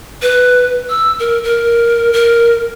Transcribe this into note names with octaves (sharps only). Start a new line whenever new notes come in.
B4
E6
A#4
A#4
A#4